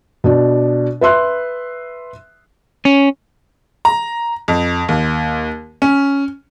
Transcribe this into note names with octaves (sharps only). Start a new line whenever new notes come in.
B2 D4
B4 E5 C6 F#6
C#4
A#5
F2
D#2
C#4